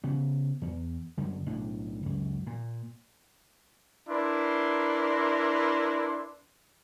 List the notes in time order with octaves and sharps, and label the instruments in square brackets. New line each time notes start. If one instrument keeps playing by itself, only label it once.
[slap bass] C#3 B3
E2
F#2 D3
B1 A2 D4
C#2 F#2
A#2
[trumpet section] D4 E4 A#4 B4 C6